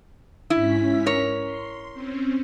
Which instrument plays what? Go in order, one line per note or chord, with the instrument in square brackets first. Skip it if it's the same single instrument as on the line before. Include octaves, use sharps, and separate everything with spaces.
[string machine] G#2 C#4 B6 [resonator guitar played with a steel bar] E4
[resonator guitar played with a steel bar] A#4 C#5
[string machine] C6
C4 C#4